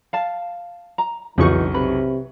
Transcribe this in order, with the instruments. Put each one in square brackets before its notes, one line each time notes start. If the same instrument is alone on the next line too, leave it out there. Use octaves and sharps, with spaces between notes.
[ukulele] F5 A5
A#5
[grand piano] B1 [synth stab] F2 C#3 C#6 [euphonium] E3 [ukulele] D#4 F4 F#4
[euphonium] C3 [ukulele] B4